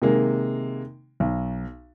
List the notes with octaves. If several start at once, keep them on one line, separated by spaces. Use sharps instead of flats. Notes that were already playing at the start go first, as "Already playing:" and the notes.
C3 D#3 G#3 A#3
B1